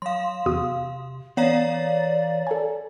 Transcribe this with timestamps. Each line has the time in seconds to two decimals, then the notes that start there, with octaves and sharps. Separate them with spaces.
0.02 F#3 F5 C6
0.46 E2 C3 F#4 D#6
1.37 E3 B3 C#5 D5 F5 A#5
2.47 A4 G#5